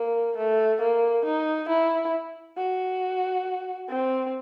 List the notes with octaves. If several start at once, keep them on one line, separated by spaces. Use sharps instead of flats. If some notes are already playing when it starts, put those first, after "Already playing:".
Already playing: A#3
A3
A#3
D#4
E4
F#4
C4